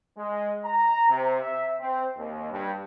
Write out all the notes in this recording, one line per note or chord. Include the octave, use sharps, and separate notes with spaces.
G#3
A#5
C3
E5
C4
D#2
G2